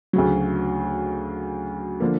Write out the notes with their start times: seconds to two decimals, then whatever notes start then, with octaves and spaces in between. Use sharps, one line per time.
0.13 D2 C#3 F#3
2.00 D3 F3 A#3